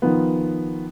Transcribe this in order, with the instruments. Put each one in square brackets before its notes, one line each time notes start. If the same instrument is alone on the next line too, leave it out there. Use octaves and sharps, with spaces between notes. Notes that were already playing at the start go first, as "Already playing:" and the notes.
[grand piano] D#3 F3 B3